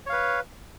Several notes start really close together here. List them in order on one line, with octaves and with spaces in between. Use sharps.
C#5 F5 B4